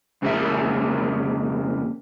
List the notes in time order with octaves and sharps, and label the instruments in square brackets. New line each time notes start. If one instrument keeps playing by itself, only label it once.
[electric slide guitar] F2 C#3 G#3 A#3 A#4 E5